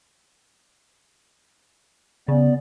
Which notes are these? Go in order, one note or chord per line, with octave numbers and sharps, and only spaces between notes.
C#3 B3 D5